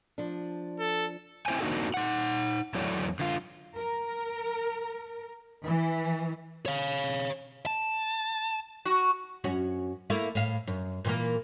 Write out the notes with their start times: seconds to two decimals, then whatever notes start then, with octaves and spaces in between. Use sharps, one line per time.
0.18 F3 D4
0.79 A4
1.46 C4 E4 F#4 C5 G5 G#5
1.60 A#3 C4 D4 D#4 F#4 A4
1.94 D#4 F#5
2.74 E2 F#3 E4 A4 C#5 D5
3.19 D3 F4
3.77 A#4
5.64 E3
6.66 C#5 F5
7.66 A5
8.85 F#4
9.44 F#2 C#4 F#4
10.10 A3 A#3 E4
10.35 A2 F5
10.67 F#2
11.05 A#2 E3 A#3